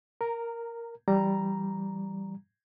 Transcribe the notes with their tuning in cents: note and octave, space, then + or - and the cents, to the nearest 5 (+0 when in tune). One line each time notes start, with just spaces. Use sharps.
A#4 +0 A#5 -20
E3 +25 G3 -5 A#5 +0